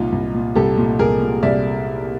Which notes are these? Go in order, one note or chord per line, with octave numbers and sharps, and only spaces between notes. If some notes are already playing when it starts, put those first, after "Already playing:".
Already playing: C2 A#2 D#4 F4
C2
A#2
C2 G4 A4
A#2
C2 G#4 A#4
A#2
C2 D5 E5